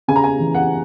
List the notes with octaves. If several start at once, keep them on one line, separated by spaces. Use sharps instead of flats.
C#3 G#5
A#5
G#5
E3
F#5